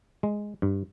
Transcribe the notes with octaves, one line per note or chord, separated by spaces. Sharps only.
G#3
G2